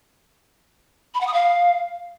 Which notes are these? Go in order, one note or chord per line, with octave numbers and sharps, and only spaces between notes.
B5
F#5
D#6
F5